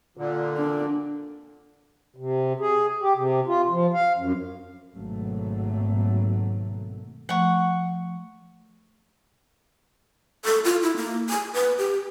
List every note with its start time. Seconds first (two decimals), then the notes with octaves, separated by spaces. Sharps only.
0.17 A#2 D3
0.57 D4
2.16 C3
2.60 G#4
3.02 G4
3.16 C3
3.47 F4
3.70 F3
3.94 F5
4.17 F#2
4.93 G#1 B2 F#3 A3 A#3
7.29 F3 A3 F#5 C#6
10.45 A4
10.64 F4
10.82 E4
10.96 A#3
11.30 G#5
11.54 B4
11.78 G4